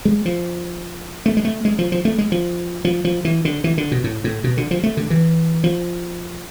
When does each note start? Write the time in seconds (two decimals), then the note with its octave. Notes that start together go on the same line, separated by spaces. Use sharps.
0.05 G#3
0.25 F3
1.26 A3
1.37 G#3
1.45 A3
1.65 G#3
1.79 F3
1.92 F3
2.05 A3
2.18 G#3
2.32 F3
2.85 F3
3.05 F3
3.25 E3
3.45 D3
3.64 E3
3.78 D3
3.92 B2
4.04 A2
4.24 A2
4.44 B2
4.57 D3
4.71 F3
4.83 A3
4.97 D3
5.10 E3
5.64 F3